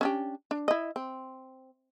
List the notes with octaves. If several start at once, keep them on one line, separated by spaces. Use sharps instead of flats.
C#4 D4 G4
D4
E4 D#5
C4